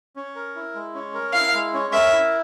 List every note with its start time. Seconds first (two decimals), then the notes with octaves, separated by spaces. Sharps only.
0.16 C#4
0.36 A#4
0.56 E4
0.75 G#3
0.95 C#4
1.14 A#4
1.33 E4 F5
1.54 G#3
1.74 C#4
1.93 A#4 E5
2.13 E4